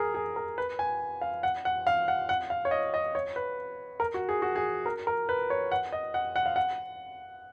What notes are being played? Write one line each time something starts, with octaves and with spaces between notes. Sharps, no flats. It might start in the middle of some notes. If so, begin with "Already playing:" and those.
Already playing: G#4 A#4
G#4
A#4
B4
G#5
F5
F#5
F#5
F5
F#5
F#5
F5
C#5
D#5
D#5
C#5
B4
A#4
F#4
G#4
F#4
G#4
A#4
A#4
B4
C#5
F#5
D#5
F#5
F#5
F5
F#5